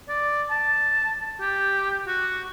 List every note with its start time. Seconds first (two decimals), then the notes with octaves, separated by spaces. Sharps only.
0.09 D5
0.50 A5
1.40 G4
2.07 F#4